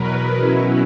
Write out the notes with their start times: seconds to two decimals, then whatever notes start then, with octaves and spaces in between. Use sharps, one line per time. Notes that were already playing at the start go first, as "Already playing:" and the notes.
Already playing: E2 B2 F#3 A#4 B4
0.38 B2 F#3 C#4 E4